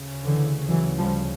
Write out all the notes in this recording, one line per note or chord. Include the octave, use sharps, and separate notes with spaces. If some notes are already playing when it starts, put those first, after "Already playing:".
Already playing: D2 C#3
D3 E3
E3 F#3
F3 G3